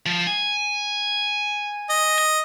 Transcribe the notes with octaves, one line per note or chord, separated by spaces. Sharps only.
F3
G#5
D#5